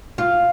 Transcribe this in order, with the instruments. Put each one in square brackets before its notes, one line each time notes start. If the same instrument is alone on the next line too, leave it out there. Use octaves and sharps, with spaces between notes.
[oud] F4